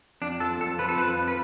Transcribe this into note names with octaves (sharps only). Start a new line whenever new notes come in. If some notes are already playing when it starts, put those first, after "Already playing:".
F2 D4
F3 A4
F2 A4
F3 B4
A4
F2 B4
F3
B4